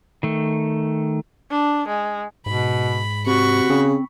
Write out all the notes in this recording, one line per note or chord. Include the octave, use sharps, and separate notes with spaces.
D#3 A3
D4
G#3
G#2 B2 B5
C3 F#4 B5 C#6
C#3 C4